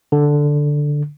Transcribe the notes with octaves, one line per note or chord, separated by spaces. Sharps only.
D3